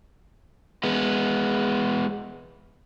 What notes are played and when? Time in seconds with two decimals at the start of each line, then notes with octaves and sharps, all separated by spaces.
0.83 G#3 B3